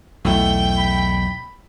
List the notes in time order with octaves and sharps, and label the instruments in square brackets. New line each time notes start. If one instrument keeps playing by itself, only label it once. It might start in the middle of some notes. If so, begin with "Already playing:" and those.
[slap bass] B1 E2 [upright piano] A3 E4 [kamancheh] G5
[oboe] B5